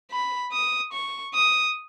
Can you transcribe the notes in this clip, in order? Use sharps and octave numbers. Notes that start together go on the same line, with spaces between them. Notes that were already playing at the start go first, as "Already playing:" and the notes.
B5
D#6
C#6
D#6